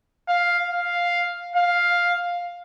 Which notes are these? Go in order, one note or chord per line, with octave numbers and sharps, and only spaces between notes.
F5
F5
F5